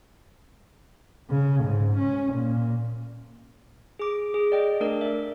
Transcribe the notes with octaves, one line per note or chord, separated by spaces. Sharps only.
C#3
G#2
C#4
A#2
G#4 D6
G#4
D5 D#5 G5
A3 D4 A#4 D5
E5